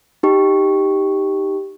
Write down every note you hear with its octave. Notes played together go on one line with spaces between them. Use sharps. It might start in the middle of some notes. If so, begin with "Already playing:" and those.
D#4 G4